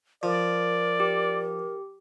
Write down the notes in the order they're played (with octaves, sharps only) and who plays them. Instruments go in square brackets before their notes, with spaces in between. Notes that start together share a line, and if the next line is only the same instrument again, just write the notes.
[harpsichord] F3 [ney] A#4 [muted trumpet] D5
[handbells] G4